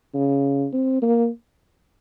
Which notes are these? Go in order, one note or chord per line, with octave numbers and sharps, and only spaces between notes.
C#3
C4
A#3